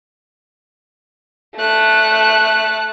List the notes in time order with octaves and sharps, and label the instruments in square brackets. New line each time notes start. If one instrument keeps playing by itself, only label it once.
[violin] A3 F#6